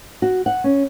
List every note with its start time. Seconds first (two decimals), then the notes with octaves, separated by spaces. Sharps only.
0.22 F#4
0.46 F#5
0.64 C#4